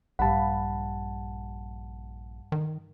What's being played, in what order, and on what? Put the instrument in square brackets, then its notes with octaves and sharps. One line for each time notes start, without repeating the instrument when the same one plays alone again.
[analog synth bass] A#1 [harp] G2 B5 [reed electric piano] F#5 A5
[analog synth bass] D#3